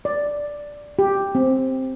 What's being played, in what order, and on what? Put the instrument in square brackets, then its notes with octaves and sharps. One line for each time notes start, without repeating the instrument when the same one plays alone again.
[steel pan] D5
G4
C4